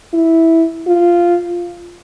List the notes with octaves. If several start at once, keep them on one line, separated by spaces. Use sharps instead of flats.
E4
F4